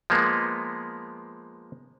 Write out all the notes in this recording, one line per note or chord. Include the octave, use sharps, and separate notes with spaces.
F3 G#3 A#3 B3